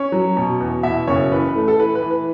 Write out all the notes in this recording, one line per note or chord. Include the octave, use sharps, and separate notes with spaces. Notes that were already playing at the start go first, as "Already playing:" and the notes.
Already playing: C#4 C#5
F#3
B2
E2
B2 E4 E5
F#1 C#4 C#5
E3 B4
B4
A3
A4
E3 B4
B4
E3
B4